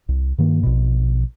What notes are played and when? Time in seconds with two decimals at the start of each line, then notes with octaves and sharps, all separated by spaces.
0.09 C2
0.38 G2 D#3 A#3
0.63 A#1 B2